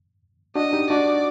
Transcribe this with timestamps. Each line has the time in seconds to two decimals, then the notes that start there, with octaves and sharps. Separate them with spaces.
0.56 D4 F#4 D#5
0.73 D#4 G4
0.90 D4 F#4 D5